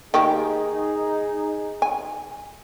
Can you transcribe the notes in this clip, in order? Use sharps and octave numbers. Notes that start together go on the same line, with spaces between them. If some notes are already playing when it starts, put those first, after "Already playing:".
D#3 A#3 D#4 G4 G#4
G#5